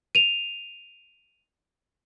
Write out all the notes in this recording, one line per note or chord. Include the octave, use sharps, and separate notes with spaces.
D#7 F7